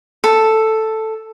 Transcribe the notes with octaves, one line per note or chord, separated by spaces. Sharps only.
A4